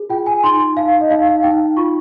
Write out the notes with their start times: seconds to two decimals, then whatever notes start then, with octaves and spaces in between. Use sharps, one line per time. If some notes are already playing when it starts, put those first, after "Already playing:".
Already playing: G#4
0.10 F4 G5
0.26 G#5
0.43 D#4 C6
0.76 D#4 F5
1.01 D#5
1.10 D#4 F5
1.28 F5
1.43 D#4 G5
1.77 F4 C#6